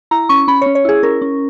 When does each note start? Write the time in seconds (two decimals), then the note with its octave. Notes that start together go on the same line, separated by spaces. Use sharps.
0.11 E4 A#5
0.29 C#4 C#6
0.48 C#4 B5
0.61 C#5
0.66 C#4
0.75 C#5
0.85 E4 G#4
1.03 C#4 A#4
1.22 C#4